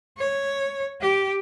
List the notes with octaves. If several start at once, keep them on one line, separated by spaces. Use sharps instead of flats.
C#5
G4